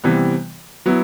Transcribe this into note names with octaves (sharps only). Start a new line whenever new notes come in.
C3 E3 G3 B3
F#3 B3 E4